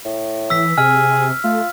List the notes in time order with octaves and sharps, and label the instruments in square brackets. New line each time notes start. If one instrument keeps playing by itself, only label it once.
[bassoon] A2
[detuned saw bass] E3 [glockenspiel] E6 B6
[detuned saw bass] C3 [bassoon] G#4 [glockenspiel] F6
[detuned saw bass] A3 [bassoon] F4